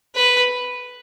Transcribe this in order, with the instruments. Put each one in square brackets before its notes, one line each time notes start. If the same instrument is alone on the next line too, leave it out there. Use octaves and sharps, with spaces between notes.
[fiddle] B4